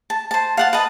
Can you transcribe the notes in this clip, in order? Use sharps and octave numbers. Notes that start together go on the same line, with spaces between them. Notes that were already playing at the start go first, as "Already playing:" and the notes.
A5
C5 A5
F5 F#5 A5
B4 D#5 A5